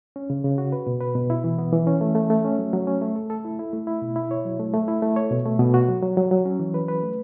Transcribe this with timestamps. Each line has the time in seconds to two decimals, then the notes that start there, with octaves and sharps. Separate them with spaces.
0.16 C#4
0.30 C#3
0.45 C#3
0.58 F#4
0.72 B4
0.87 B2
1.01 B4
1.15 B2
1.30 E4
1.44 E3
1.58 B3
1.73 E3
1.87 C#4
2.01 A3
2.15 A3
2.30 A3
2.44 C#4
2.59 F#3
2.73 F#3
2.87 C#4
3.01 A3
3.16 A4
3.30 A4
3.45 E4
3.59 E4
3.73 A3
3.87 E4
4.02 B2
4.16 E4
4.31 C#5
4.45 F#3
4.60 A3
4.74 A3
4.88 E4
5.02 A3
5.16 C#5
5.31 B2
5.45 A3
5.59 B2
5.74 F#4
5.88 F#3
6.03 F#3
6.17 F#3
6.31 F#3
6.45 C#4
6.60 E3
6.74 B4
6.88 B4
7.02 A3